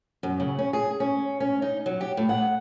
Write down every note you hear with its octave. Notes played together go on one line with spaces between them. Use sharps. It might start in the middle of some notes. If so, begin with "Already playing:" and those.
F#2
C#3
C#4
G#4
C#4
C#4
D#4
F#3
G4
A2
F#5